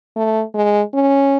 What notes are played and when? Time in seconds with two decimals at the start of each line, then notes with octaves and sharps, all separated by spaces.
0.16 A3
0.55 G#3
0.94 C#4